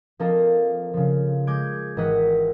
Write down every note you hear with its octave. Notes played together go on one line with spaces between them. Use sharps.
F3 A#3 C4 A4 A#4 D#5
C#3 F3
G#3 D6 G6 G#6 D7
G#1 E3 A#4 D#5 F#5 B6